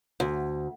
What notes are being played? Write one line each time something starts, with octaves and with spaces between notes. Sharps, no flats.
D2